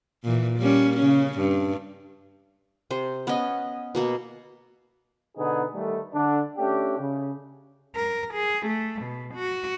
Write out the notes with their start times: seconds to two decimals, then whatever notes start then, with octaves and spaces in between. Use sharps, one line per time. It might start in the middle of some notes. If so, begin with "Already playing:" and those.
0.24 A#2 E3
0.58 G3 A#3 C#4
0.97 C#3 C#4
1.39 G2
2.91 C3 C5
3.27 B3 C#4 D#5 F#5
3.95 B2 A#3 F#4
5.37 B2 D3 B3 D#4 G#4
5.74 D#3 G3 A3
6.14 D3 D4
6.58 A3 C#4 D4 G4
6.99 C#3
7.95 A#4
8.34 G#4
8.66 A3
9.02 B2
9.34 F#4